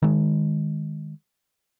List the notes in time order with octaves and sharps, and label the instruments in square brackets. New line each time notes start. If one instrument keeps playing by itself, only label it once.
[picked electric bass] D#3 G#3